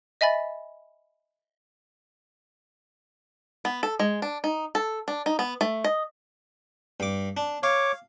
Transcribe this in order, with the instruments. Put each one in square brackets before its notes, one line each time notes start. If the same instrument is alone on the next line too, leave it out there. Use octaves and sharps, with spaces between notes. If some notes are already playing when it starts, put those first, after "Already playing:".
[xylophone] D#5 E5 G#5 B5 A6
[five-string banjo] B3
A4
G#3
D4
D#4
A4
D4
D#4
B3
A3
D#5
[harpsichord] G2 D6
D4
[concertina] C#5 D6 [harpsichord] F5